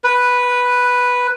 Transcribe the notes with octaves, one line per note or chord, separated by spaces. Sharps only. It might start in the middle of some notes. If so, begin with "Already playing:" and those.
B4